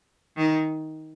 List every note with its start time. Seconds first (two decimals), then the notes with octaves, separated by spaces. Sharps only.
0.37 D#3